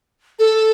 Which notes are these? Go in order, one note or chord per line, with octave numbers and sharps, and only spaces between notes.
A4